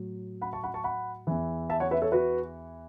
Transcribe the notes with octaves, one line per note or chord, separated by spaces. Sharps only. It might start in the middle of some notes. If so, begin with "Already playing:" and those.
Already playing: A2 F#3
F#5 B5
A5 C#6
F#5 B5
A5 C#6
F#5 B5
E2 E3
E5 A5
C#5 F#5
B4 E5
A4 C#5
F#4 B4